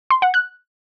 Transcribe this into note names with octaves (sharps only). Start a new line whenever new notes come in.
C6
F#5
F#6